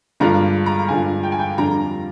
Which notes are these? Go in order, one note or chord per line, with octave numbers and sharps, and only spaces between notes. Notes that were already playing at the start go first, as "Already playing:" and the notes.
G2 D3 G#3 D4 F4 A#5
A#5
G2 D3 G#3 D4 F4 G#5
G5
G#5
G5
F2 D3 G3 D4 F4 A#5